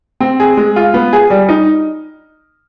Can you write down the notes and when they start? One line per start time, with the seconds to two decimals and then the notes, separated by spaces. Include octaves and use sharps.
0.20 C4
0.40 G#4
0.57 G#3
0.76 F4
0.94 B3
1.13 G#4
1.30 G3
1.49 D#4